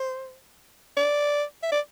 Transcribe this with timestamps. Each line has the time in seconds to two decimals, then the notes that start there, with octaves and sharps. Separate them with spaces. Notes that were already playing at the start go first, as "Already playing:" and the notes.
Already playing: C5
0.97 D5
1.63 E5
1.72 D5